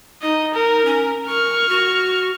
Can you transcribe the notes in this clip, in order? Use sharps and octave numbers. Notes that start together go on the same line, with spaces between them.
D#4 D#5
A#4
C#4
A#4 C#6 F6
F#4